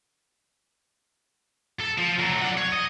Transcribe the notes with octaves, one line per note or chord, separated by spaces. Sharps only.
A4
F3
F#3 A3
D5 F#5
C#5
D#5